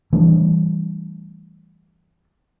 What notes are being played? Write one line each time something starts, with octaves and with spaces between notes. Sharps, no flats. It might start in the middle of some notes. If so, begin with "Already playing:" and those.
E3 G3 A3 D4